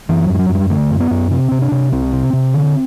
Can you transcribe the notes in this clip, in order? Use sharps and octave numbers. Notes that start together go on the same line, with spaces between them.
F#2 E3
F#3
F#2
G3
F#3
F#2
G3
D3 A3
F#2
B3
F#2
C3 C4
C3
D4
C3
C2 C4
C3
C3
D3